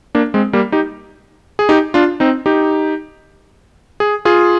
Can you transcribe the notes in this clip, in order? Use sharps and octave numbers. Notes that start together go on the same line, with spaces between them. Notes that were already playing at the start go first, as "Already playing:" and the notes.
A#3 D4
G#3 C4
G3 A#3
D#4 G4
G#4
D#4 G4
D4 F4
C4 D#4
D#4 G4
G#4
F4 G#4